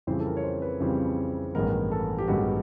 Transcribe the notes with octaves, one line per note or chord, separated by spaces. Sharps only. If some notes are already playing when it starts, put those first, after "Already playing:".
F2 C#3 E3 G3 C4 C5
A4
A#4
C#5
C5
B4
F2 C#3 E3 G3 C4
A1 G2 D#3 G#3 B3 A#4
A4
G4
A1 G2 D#3 G#3 B3 F#4